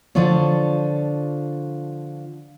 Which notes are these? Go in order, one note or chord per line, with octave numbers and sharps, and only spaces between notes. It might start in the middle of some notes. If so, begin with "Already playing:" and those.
D3 F3 D4 F4 C#5